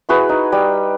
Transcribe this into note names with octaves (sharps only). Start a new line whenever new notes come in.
E4 F#4 G#4 B4
D#4
G3